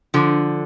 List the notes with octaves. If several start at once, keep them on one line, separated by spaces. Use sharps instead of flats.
D3 F3